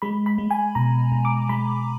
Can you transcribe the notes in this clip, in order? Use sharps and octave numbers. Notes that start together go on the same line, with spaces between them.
G#3 B5
B5
G#3
G#5
B2 A#5
B2
D6
G#3 B5